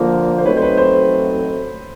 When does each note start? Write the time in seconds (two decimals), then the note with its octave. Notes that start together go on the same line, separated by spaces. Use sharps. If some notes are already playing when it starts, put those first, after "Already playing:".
Already playing: D3 F3 A#3
0.38 C5
0.45 F#3 A3 C4 D#4 B4 C#5
0.57 C5
0.62 B4
0.77 C5